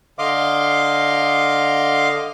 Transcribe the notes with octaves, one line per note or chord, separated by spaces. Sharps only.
D3 D#5 F5 C6 D6